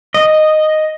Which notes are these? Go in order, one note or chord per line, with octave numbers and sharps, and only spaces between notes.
D#5